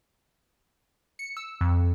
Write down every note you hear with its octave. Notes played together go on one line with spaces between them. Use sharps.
C#7
E6
F2